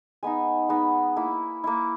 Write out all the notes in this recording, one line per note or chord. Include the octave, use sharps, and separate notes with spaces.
G#3 B3 D#4 G#5
G#3 B3 D#4
A#3 E4
A#3 E4